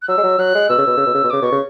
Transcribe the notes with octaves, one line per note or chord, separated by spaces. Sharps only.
F#6
F#3 E6
G#3
F#3
F#3 F#6
G#3
B2 E6
C#3
B2
C#3
B2
C#3
B2
C#3 D6
B2 C#6
C#3